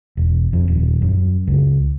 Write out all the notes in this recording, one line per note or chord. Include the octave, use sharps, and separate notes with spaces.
E1
F2
D#1
F#2
C#2